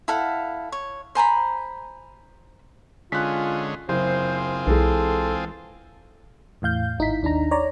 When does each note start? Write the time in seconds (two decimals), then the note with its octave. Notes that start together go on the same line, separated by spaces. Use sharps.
0.08 E4 A4 F5 F#5
0.72 C#5
1.15 C5 G#5 A#5 B5
3.12 D3 G#3 C#4 F4 F#6 B6
3.89 F#1 C4 F4 G#4 C5
4.67 B1 E3 G#3 A4
6.62 E2 A2 F5 G6
6.98 G#1 D#4 E4 B6
7.22 D#2 D4 D#4 A#5
7.51 C#5 D5 A#5